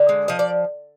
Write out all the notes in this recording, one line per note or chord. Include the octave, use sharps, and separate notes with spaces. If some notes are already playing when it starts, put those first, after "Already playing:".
Already playing: D3
G#3
F3 D#5
D5